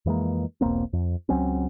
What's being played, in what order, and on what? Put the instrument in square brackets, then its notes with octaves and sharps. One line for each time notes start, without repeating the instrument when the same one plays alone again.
[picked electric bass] F2 E3 G#3 A#3
E1 B1 A#3 C4
F2
C#2 F#3 C4 C#4